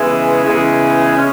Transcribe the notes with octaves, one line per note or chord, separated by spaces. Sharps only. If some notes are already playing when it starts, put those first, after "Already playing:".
Already playing: C#3 E3 G#3 B3 E4
C#3 E3 G#3 B3 E4
C#4